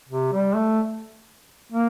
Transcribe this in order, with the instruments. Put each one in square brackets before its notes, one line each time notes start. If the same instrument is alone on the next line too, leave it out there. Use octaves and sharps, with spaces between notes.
[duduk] C3
G3
A3
A#3